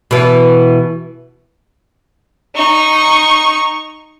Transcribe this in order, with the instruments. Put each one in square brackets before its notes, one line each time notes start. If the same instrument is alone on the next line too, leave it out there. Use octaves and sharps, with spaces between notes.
[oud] B2 E3
[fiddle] D#4 C#6